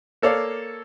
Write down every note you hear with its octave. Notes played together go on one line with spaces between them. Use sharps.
A#3 A4 C#5 D5 F5